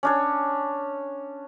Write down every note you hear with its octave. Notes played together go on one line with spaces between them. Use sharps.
C#4 D4 C#5